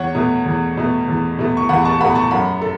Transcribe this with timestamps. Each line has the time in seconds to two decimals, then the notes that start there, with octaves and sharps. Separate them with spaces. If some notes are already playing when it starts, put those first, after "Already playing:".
Already playing: E2 C#5 F#5
0.15 B2 A3
0.46 E2
0.77 B2 A3
1.08 E2
1.39 B2 A3
1.57 C#6
1.69 E2 F#5 B5
1.85 A5 C#6
2.00 B2 A3 F#5 B5
2.15 A5 C#6
2.31 F#2 F#5 B5
2.62 A4